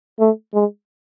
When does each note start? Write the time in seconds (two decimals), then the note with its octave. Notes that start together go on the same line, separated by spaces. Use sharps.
0.20 A3
0.54 G#3